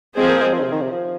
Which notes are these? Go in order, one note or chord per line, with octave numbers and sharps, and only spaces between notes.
F3 G#3 C4 G#4 C5
A#3
G#3
F3
D#3
C3
D#3
C3
F3